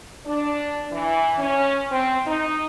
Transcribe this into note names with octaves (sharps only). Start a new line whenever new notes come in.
D4
E3
C#4
C4
D#4